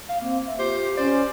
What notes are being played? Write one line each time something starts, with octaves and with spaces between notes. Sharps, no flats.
F5
A#3 C4
E5
F4 G4 C5
C#4 C5 D5